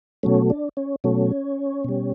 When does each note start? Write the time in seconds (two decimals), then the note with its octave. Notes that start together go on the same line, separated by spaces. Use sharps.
0.23 B2 F#3 A3 C#4
0.50 D4
0.77 C#4
1.04 B2 F#3 A3 C#4
1.84 B2 G3